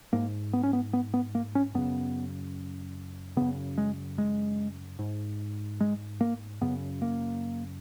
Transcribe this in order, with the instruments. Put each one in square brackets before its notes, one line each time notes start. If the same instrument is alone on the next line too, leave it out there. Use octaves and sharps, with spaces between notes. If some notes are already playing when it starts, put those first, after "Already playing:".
[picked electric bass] G#2 A#3
B3
C#4
B3
B3
B3
A#3
C#4
F#2 C#3 B3
F#2 C#3 B3
G#3
G#3
G#2
G#3
A#3
F#2 C#3 B3
A#3